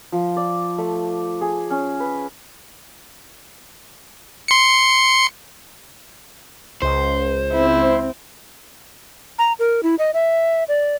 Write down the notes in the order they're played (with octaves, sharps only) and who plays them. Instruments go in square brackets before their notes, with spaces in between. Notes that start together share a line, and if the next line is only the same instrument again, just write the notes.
[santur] F3
D5
A3
G#4
C#4
B4
[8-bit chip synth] C6 C#7
[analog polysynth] C#2 [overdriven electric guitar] C5
[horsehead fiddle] C4 [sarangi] E4
[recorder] A#5
A#4
E4
D#5
E5
D5